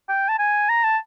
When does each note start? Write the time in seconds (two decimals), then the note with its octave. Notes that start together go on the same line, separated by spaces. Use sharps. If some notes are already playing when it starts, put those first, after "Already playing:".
0.09 G5
0.29 A5
0.39 G#5
0.69 A#5
0.84 A5